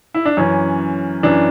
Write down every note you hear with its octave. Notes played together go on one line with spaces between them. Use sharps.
E4
D4
F#2 E3 C#4
F#2 E3 D4